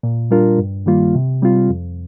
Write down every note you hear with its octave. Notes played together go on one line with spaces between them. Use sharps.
A#2
G3 D4 F4 A#4
G2
D#3 G3 A#3 F4
C3
G3 C4 F4
F2